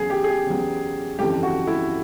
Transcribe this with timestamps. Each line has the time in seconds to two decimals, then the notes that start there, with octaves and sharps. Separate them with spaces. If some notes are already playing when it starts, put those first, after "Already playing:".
Already playing: E2 C#3 F#3 G#4
0.10 G4
0.24 G#4
0.28 G4
0.47 E2 C#3 F#3
1.18 G1 F2 C#3 E3 G4
1.43 F#4
1.67 E4